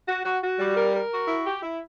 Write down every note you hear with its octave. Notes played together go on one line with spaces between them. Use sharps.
F#4
F#4
F#4
G3
A#4
A#4
F#4
E4
G4
E4